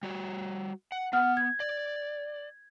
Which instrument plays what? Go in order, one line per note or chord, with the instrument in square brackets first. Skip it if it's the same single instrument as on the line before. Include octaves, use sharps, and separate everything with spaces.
[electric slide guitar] G3 F#4
F#5
[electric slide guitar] B3 [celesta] F#5 F6
[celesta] G#6
[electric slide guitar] D5